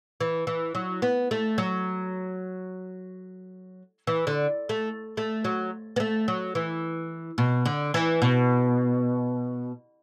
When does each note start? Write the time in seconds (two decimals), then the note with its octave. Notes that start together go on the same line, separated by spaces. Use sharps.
0.20 E3
0.47 E3
0.75 F#3
1.02 B3
1.31 A3
1.58 F#3
4.07 E3
4.27 D3
4.69 A3
5.17 A3
5.45 F#3
5.96 B3
6.00 A3
6.28 F#3
6.55 E3
7.38 B2
7.66 D3
7.94 E3
8.22 B2